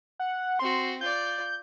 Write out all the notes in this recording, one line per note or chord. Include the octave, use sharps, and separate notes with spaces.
F#5
C4 F#4 C6
F4 D5 G6